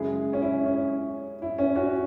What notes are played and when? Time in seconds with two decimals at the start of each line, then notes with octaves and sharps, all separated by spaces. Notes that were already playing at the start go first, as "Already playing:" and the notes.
Already playing: F#2 C#3 G#3 E4 G#4
0.33 C#4
0.42 E4
0.66 C#4
1.42 E4
1.58 C#4
1.76 C#4 F#4